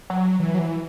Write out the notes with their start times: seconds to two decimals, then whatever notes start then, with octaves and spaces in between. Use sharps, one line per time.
0.10 F#3
0.39 E3
0.55 F#3
0.59 E3